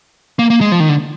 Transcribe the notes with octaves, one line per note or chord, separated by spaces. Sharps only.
A#3
A#3
G#3
F3
D#3
D3